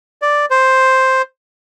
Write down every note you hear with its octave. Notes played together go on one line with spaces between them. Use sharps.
D5
C5